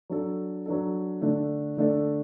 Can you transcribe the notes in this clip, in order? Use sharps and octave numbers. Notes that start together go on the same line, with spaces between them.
F#3 D4 A4
F#3 D4 A4
D3 A3 D4 A4
D3 A3 D4 A4